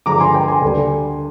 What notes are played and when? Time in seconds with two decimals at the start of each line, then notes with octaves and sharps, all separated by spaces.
0.06 G2 D3 F3 G#3 A#5 D6
0.20 G#5 C6
0.34 G5 A#5
0.48 G#5 C6
0.62 D2 D3 G3